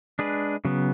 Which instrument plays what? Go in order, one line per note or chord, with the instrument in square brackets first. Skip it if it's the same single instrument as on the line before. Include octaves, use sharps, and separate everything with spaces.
[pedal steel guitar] G#3 D4 G#4 B4
C#3 F#3 B3